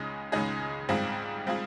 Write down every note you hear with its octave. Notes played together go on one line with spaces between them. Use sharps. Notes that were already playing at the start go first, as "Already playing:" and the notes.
Already playing: C#2 C#3 G#3 D#4 G#4
C#2 C#3 G#3 D#4 G#4
G#2 G3 C4 F4 G#4
G3 C4 F4 G#4